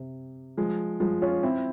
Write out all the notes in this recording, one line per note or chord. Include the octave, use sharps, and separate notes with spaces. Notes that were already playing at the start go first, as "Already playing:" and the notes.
Already playing: C3
F3 G#3
F3 G#3
C#4 F4
C4 E4